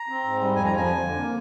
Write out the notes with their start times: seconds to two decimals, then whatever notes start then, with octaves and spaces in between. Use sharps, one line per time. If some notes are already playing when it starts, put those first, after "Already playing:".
Already playing: A#5
0.09 C4
0.24 G#2
0.39 G3
0.55 F2 G#5
0.65 A#5
0.70 F3
0.76 G#5
0.86 F2
1.02 D3
1.17 A#3